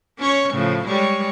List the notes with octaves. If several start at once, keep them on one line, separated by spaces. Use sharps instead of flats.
C#4 C#5
A2 C#3 F3
G3 G#3 C#5